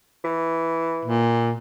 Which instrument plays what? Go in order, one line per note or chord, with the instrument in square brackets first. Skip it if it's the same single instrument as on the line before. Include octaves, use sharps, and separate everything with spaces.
[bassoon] E3
[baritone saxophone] A#2